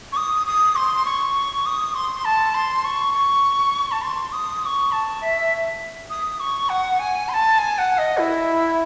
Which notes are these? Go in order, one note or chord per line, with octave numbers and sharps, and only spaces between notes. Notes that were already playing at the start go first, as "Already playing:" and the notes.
C#6
D#6
D#6
C6
C#6
D#6
C6
C6
A5
C6
C#6
C#6
A5
C6
D#6
D#6
C#6
A5
E5
D#6
C#6
F#5
G#5
C6
A5
G#5
F#5
D#5
E4